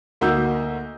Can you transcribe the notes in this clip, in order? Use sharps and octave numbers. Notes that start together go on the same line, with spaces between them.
D2 A#3 D#4 F#4 E6 G6